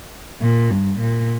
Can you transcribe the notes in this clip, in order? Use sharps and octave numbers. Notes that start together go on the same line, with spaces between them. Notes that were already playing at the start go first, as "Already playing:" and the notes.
A#2
G2
A#2